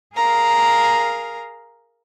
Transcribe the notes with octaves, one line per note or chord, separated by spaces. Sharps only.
G#4 A#4 F5 A#5